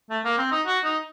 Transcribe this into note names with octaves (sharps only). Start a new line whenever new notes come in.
A3
A#3
C4
D#4
F#4
D#4